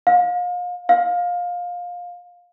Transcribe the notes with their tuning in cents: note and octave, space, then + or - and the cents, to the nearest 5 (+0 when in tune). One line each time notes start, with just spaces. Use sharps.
F5 +35
F5 +20